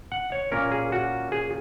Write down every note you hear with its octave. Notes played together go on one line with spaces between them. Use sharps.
F#5
C#5
A#2 A#3 C#4 A#4
G#4
F#4
G#4